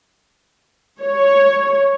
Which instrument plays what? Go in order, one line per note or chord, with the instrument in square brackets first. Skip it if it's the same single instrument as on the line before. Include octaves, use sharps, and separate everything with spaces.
[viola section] C#5